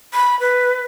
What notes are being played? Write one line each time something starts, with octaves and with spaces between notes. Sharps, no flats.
B5
B4